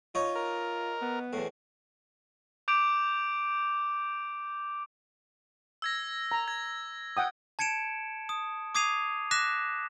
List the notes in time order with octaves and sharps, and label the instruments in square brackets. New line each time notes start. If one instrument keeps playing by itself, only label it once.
[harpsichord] D#4 C#5 [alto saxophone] F4
[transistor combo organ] A#4
[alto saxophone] B3
[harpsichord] E2 A2
[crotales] D6 G6 D7 F7
E6 G#6 A#6
[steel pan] A#5
[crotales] G#6
[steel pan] F#5 G5 D#6
[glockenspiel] A5 G#6 C#7 D7 E7
D#6
D6 D#6 G#6 C7 D#7 F7
D6 F#6 A#6 B6 E7